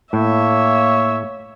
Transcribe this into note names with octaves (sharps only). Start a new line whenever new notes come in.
A2 A#3 C#5 E5